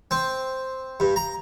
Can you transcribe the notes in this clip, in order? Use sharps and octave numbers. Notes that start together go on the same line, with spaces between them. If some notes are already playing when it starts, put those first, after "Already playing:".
C4
G2
A#5